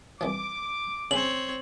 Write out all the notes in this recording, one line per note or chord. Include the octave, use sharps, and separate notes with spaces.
C2 E3 F3 D6
C#3 C4 C#5 G#5 F#7